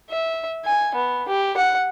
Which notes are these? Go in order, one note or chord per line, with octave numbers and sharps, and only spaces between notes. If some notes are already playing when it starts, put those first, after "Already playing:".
E5
G#5
B3
G4
F#5